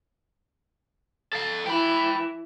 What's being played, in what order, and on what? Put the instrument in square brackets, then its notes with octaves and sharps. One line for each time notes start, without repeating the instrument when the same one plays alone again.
[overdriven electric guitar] A4 F5
[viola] E3 E4 [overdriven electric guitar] G5 B5